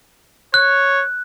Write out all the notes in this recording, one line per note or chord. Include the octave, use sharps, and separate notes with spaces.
C#5 F#6